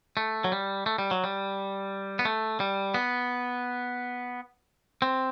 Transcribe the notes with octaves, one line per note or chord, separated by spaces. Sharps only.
A3
F#3
G3
A3
G3
F#3
G3
B3
A3
G3
B3
C4